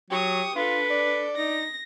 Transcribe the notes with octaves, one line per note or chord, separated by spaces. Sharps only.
F#3 G4 C#6 D#6
D4 F4 A4 B4
D5
D#4 A#6